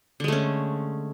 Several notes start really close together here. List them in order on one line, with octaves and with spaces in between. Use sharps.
D3 G#3 A3 C#4